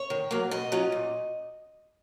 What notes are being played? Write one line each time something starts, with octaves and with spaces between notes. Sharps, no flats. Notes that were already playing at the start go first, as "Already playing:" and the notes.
Already playing: C#5
D#3
F#3 A#3
B2 D#5
F#3 C#4 F4
A#2